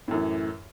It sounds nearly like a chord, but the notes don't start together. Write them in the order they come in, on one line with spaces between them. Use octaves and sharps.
A2 F#2 E3